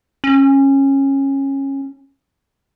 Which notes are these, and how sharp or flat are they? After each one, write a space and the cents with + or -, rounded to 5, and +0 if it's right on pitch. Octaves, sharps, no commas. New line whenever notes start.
C#4 -20